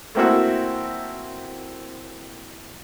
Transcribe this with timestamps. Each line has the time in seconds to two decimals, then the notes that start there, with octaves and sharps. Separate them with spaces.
0.15 A3 A#3 C4 E4 F#4 E5